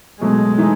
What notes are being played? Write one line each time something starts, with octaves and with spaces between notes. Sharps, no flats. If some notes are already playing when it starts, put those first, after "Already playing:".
B2 F#3 G#3 A3
E3 A3 D#4